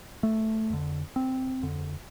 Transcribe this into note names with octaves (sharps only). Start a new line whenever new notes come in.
A3
F2 D3
C4
F2 D3